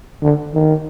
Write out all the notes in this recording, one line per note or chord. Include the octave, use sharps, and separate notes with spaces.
D3
D#3